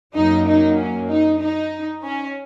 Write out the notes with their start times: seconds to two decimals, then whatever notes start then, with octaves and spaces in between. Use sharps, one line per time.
0.15 F#2 F#3 A#3 D#4
0.47 D#4
0.78 C#4
1.09 D#4
1.39 D#4
2.03 C#4